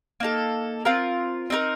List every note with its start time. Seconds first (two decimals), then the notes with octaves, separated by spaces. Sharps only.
0.20 A#3 D#4 A4
0.85 C4 F4 A#4
1.50 C4 D#4 A#4